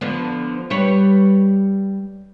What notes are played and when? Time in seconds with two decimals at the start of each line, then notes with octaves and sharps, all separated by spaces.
0.01 D3 F3 B3
0.70 G3 B4 C#5